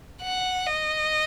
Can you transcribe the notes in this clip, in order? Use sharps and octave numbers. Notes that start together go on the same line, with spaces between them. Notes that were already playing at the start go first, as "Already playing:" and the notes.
F#5
D#5